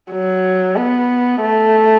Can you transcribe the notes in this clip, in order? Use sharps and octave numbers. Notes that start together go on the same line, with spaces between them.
F#3
B3
A3